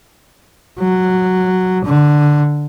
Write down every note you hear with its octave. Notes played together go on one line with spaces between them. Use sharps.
F#3
D3